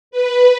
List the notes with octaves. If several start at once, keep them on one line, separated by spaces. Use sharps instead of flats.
B4